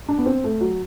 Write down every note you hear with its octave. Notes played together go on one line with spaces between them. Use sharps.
D4
B3
C4
A3
F#3